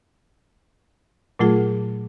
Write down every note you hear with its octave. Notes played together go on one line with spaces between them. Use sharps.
A#2 F#3 A3 F4 G#4